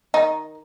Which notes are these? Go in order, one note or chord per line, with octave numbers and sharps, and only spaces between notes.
D#3 D#4